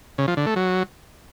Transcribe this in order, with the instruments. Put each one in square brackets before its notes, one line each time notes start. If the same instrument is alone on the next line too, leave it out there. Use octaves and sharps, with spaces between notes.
[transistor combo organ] C#3
F3
D3
A3
F#3